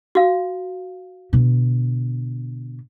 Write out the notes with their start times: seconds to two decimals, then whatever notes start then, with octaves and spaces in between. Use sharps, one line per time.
0.15 F#4 F5
1.33 B2 D3